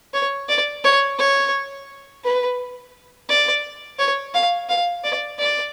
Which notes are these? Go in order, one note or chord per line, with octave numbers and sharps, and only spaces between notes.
C#5
D5
C#5
C#5
B4
D5
C#5
F5
F5
D5
D5